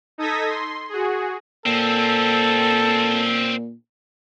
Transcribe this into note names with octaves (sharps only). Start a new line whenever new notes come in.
D#4 A4 D#6 G#6 A#6 B6
C6
F#4 G#4
A#2 C4 C#4 A4